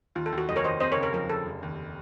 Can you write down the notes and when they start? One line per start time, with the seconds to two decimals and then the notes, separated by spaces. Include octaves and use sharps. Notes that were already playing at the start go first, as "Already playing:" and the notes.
0.15 D#2 F4
0.26 A4
0.32 D#2
0.38 F#4
0.49 F1 D#5
0.56 A#4 C#5
0.64 D#2 C5 D#5
0.80 C4 C5 D#5
0.92 A#4 C#5
0.97 C#3
1.03 A#4 C#5
1.13 F3 A#4
1.29 C#3 A4
1.45 F1
1.63 D#2